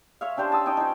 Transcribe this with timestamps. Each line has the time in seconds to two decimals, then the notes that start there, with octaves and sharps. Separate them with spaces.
0.21 C#5 E5 F5
0.37 C#4 D4 G4 C5
0.52 A5 D#6 E6
0.66 C#4 D#4 G5 D#6
0.77 F3 D#4